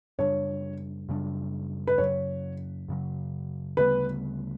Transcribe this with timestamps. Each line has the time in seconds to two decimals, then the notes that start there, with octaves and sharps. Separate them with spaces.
0.19 F#2 C#3 G3 D4 C#5
1.09 F#2 C#3 G3 D4
1.87 B4
1.98 F#2 C#3 F#3 C#5
2.88 F#2 C#3 F#3
3.77 D2 C#3 G3 B3 B4